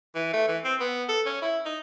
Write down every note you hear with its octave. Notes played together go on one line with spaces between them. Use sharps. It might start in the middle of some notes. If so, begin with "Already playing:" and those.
E3
A3
E3
C4
B3
A4
C#4
E4
D#4